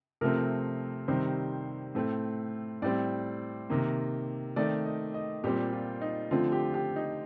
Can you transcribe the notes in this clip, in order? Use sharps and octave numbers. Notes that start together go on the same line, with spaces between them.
C3 F3 A3 C4 A#4
C3 D#3 G3 C4 C5
A2 A3 C4
A2 G3 C4 D5
C3 D#3 A#3
D#3 A3 C4 D5
D#5
D#5
A#2 G3 C4 G4
F4
D#4
D3 F3 A3 C4 F4
G4
G4
D#4